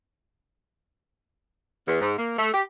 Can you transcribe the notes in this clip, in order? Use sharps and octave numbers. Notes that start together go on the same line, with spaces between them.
E2
G#2
A#3
A3
G4